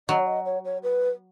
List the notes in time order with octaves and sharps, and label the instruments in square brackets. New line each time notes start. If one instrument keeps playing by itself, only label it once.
[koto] F#3 [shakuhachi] D#5
[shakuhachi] C#5
D#5
C#5
C#5
B4